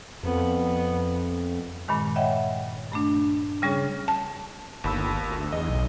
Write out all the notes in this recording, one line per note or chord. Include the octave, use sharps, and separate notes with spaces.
F2 B3
G2 A#2 D#3 G#3
C#5 D#5 E5 F#5 G5
G2 A3 D4
C#3 G3 C#4 G#4 C#5 F6
A5
G1 D#2 B5 E6
D2
E2 D#5
B1